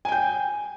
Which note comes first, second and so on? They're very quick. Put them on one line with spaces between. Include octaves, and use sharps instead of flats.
G#5 G5 G6